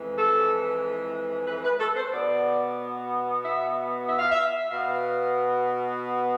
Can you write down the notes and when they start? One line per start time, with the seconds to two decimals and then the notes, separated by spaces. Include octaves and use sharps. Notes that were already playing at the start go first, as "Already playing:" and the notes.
Already playing: F2 E3 G#3
0.18 A4
1.48 B4
1.64 B4
1.80 A4
1.96 C5
2.13 B2 B3 D5
3.42 E5
4.07 E5
4.18 F5
4.31 E5
4.72 B2 B3 F5